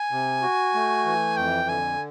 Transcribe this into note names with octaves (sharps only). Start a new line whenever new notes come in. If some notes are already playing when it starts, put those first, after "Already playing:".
Already playing: G#5
C3
F#4
A3
E3
F2 G5
D3 G#5